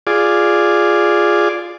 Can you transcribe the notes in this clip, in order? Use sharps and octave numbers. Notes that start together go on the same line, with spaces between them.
F4 G#4 D5